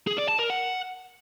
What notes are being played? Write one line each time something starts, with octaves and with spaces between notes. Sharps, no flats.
G#4
D5
A5
A#4
F#5